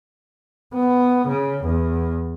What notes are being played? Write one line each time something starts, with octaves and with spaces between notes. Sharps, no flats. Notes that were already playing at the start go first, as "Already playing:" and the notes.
B3
C#3
E2